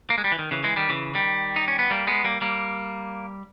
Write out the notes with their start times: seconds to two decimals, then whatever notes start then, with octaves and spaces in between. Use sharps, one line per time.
0.10 A#3
0.18 G#3
0.24 G3
0.32 E3
0.39 D#3
0.51 C#3 E3
0.64 E3 G#3
0.76 D#3 G3
0.89 C#3 E3
1.14 D#3 G3
1.56 D#4
1.68 C#4
1.79 B3
1.91 G3 A#3
2.07 G#3 B3
2.24 G3 A#3
2.41 G3 A#3